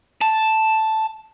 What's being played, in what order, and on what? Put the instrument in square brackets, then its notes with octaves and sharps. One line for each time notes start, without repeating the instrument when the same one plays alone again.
[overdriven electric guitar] A5